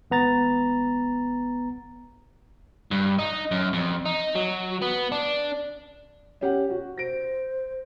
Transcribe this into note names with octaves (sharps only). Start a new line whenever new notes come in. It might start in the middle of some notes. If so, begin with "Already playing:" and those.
G#1 B3 A#5 A6
G2
D#4
F#2
F2
D#4
F#3
B3
D4
C#4 G4 F#5
F#4
C5 A#6 D7